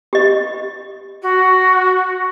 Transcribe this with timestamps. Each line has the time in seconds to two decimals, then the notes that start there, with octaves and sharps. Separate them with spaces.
0.13 G4 D#5
1.22 F#4